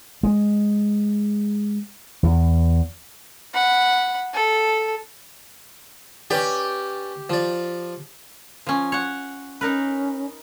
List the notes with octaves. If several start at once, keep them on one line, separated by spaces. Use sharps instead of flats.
G#3
E2
F#5 B5
A4
C#4 G4 B4 D5
F3 D5
F3 C#4
C#5 F#5
C#4 D#4 A#4 B4